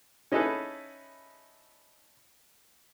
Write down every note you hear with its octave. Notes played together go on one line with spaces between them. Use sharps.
C#4 D#4 E4 G#4 A4 B4